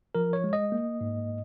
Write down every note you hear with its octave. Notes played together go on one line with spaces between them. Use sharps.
F3 A#4
C#5
G#3
D#5
A#3
G#2